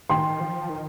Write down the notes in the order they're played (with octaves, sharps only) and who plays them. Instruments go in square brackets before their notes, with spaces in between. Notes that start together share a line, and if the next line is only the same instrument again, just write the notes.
[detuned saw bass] D#3 [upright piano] G5 C6
[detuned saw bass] F3
D#3